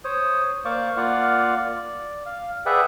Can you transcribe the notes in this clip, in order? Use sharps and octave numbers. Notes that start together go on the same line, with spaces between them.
C5 C#5 D#6
A#3 C5 D5 F5 C#6 D6
A#3 F4 D5 F5 F#5
D5
F5
G#4 B4 D5 E5 F#5 G5